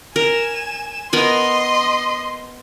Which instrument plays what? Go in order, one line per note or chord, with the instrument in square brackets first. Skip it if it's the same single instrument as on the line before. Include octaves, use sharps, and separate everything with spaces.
[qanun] A#4 [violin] G#5 E7
[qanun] B3 A#4 G#5 [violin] D#5 C6